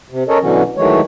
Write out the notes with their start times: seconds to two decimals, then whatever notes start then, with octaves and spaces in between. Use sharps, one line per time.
0.10 C3
0.29 C#4 A4 A#4 C#5 D#5
0.41 B2 D3 E3 F#3 C#4
0.77 D#3 E3 F#3 G#3 A3 C#5